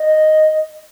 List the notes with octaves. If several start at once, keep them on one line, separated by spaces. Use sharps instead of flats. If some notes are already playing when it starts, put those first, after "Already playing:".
Already playing: D#5